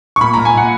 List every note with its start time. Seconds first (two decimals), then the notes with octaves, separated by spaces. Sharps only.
0.16 C#6
0.21 A#2 B5
0.34 A#2 A#5
0.45 G#5
0.54 A#2 F#5